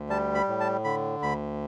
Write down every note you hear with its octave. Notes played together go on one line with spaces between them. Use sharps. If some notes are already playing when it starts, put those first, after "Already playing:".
Already playing: D2
G3 A5
B5
A2
A5
D3 B5
D2 B5